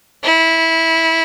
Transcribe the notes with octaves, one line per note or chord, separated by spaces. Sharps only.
E4